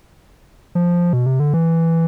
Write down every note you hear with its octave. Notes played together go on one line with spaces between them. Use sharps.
F3
B2
C3
D3
E3